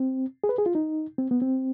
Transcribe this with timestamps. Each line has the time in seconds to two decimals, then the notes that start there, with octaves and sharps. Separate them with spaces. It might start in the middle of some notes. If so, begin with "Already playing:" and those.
Already playing: C4
0.44 G#4
0.49 B4
0.58 G#4
0.66 F4
0.75 D#4
1.18 C4
1.31 B3
1.42 C4